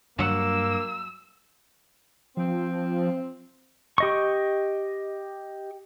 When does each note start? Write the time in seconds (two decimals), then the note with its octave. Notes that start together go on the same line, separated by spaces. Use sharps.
0.19 G2 F#3 A#3 F#5 E6
2.37 F3 C4
3.98 G4 D#5 C#6